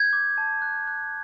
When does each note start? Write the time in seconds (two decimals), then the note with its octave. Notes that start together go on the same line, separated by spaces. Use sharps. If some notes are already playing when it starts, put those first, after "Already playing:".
Already playing: G6 G#6
0.13 D6
0.38 A5
0.62 F#6
0.87 F#6